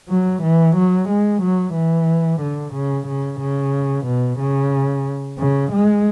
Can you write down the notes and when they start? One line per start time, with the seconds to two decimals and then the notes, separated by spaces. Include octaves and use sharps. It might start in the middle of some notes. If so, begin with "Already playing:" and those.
0.09 F#3
0.42 E3
0.76 F#3
1.09 G#3
1.42 F#3
1.74 E3
2.41 D3
2.73 C#3
3.07 C#3
3.40 C#3
4.05 B2
4.39 C#3
5.38 C#3
5.72 G#3